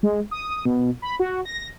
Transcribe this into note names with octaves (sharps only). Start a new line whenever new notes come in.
G#3
D#6
B2
B5
F#4
A#6